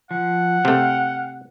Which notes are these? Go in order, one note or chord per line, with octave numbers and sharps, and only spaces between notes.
F3 F#5
C3 A3 F5 G5